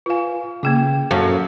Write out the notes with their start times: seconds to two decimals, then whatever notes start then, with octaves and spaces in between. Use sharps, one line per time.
0.06 F4 B4 F5 G#5
0.63 C#3 A#3 G#4 G5 D6
1.11 F#2 A4 F5 A5